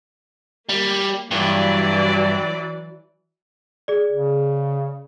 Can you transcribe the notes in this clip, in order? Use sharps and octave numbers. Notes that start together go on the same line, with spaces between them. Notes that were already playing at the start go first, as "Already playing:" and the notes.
G3 A#3
G2 E3 F#3 D5
G#4 D5
C#3